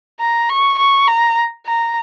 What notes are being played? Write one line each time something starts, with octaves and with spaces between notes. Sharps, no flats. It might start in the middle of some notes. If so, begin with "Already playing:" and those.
A#5
C#6
C#6
A#5
A#5